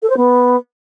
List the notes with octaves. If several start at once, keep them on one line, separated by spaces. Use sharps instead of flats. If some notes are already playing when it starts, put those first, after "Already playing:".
A4
C5
B3